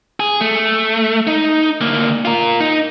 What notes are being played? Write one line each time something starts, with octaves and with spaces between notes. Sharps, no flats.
G#4
A3
D#4
D2 A#3
F4 A#4
D#4